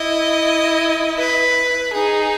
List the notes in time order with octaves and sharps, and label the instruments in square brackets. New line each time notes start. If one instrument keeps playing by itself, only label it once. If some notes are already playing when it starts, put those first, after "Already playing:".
Already playing: [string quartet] E4 [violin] D#5
[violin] B4
[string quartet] D#4 [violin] G#4